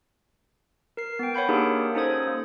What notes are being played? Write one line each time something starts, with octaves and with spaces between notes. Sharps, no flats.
A#4 C7
B3 G5
C#5 F#5 B5 G6
A#3 D4 D#4 G4 G#4 A#4
C#4 D#4 A4 C5 D#6 G#6
A#3